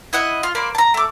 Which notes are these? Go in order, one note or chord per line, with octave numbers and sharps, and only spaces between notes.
E4 D#5 F#5
F4
A#3 C5 D5 B5
A5 A#5
A3 D6